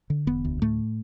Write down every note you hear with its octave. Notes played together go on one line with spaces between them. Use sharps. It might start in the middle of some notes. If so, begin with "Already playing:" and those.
D3
E1 B3
D2
A2 A3